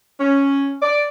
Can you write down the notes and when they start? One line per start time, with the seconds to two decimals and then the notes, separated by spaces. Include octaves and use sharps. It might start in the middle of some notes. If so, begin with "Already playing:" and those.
0.20 C#4
0.82 D5